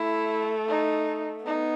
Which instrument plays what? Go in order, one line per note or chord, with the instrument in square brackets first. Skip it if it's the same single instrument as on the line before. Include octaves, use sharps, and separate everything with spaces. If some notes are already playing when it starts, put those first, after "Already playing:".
Already playing: [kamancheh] A3 [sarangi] E4
[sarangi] D#4
[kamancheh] B3 [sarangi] D#4